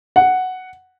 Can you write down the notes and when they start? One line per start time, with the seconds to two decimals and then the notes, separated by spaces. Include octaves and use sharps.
0.16 F#5